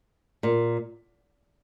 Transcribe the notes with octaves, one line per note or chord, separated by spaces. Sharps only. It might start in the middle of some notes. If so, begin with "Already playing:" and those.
A#2